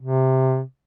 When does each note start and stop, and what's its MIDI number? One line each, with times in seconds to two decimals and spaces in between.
0.01 0.62 48